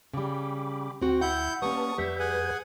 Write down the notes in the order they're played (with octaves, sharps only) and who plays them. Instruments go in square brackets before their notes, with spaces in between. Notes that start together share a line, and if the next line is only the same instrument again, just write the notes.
[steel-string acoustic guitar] C#3 G3 [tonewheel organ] G5 B5 D6
[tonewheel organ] D2 G5 [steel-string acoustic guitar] C4 F#4
[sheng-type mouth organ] E4 G6 [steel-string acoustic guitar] F#5
[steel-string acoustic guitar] G3 A#3 C#4 [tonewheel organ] B4 A5 [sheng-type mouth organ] C#6 D#6
[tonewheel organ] F2 B4 G6 [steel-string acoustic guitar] G3 [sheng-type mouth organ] E5
[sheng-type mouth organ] G#4 F#5 G#5